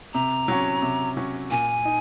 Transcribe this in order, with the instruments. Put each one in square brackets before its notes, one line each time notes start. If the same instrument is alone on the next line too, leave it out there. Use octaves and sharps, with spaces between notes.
[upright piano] C3 [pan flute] A#5
[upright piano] F#3 C#4
C3
F#3 C#4
[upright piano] A#2 [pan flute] G#5
[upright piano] D#4